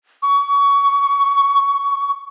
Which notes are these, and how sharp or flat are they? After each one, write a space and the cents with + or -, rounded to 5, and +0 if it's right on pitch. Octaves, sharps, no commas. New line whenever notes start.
C#6 +20